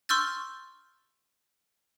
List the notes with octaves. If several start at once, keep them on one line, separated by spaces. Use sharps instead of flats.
C6 C#6 E6 F6 G6 A6